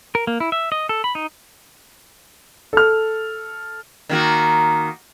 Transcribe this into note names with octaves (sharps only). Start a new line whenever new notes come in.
A#4
A#3
E4
E5
D#5
A4
B5
D#4
A4 F6
D#3 A#3 F#4